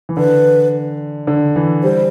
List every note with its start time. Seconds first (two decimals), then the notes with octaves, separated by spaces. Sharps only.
0.09 E3
0.17 D3 B4
1.27 D3
1.56 E3
1.83 G3 C5